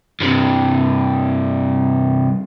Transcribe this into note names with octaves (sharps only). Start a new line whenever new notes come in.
G2 C3